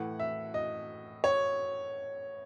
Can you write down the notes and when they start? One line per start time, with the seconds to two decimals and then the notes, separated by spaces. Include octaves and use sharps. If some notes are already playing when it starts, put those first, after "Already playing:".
Already playing: A2 E3 F#5
0.20 E5
0.54 D#5
1.24 C#5